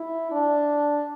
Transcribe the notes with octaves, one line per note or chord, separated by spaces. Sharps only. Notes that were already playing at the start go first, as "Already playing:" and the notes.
Already playing: E4
D4